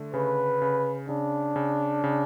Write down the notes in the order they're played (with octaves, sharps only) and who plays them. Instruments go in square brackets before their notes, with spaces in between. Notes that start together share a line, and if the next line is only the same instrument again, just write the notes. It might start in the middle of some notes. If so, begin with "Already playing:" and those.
Already playing: [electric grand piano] D3 A3
[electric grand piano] C#3 [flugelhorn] B4
[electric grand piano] C#3
[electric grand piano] C#3 [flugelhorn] D4
[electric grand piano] C#3
C#3